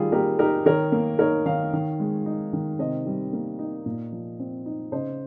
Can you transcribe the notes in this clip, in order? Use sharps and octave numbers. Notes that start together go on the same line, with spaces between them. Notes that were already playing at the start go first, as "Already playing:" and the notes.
Already playing: D#3 G3 F4 G#4
A#3 G4 A#4
D#4 G4 A#4
D#3 A#4 C#5
A#3
D#4 A#4 C#5
D#3 C#5 F5
D#3
G#3
D#4
D#3
C3 C5 D#5
G3
A#3
D#4
A#2
F3
C4
D#4
C#3 C5 D#5